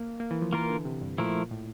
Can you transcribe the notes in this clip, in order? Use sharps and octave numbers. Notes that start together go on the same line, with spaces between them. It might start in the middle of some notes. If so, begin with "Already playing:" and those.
Already playing: A#3
A#3
E3
F3
E3 A#3 F4 A#4
D3
C3
G2
A#2 F3 A3 E4 A#4
A2